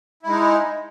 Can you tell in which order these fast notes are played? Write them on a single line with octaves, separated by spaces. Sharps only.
E4 G#3 D#4